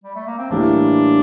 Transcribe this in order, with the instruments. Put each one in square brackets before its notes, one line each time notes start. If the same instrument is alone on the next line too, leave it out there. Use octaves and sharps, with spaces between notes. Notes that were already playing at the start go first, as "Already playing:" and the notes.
[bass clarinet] G3
A3
A#3
C4
[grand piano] A2 E3 G3 A#3 E4 [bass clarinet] D4